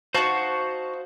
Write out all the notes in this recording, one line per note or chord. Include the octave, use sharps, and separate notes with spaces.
D#4 F#4 C5 F5 A5